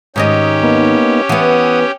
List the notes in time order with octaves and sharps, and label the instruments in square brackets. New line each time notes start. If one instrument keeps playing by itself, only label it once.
[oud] G#2 D#3 D#5 [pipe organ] C#4 G4
[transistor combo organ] A#3 B3 D#4
[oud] E3 B3 [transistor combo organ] F#5 D#6